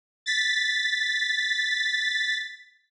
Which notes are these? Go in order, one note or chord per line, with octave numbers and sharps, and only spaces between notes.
A6 B6